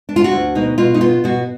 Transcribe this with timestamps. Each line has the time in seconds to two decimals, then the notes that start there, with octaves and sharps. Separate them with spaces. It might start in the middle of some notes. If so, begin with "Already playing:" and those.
0.09 D4
0.16 F4
0.24 F#4
0.32 D2
0.55 B2 D#4
0.78 B2 F4
0.94 D#4
1.01 B3 F4
1.24 B2 F#4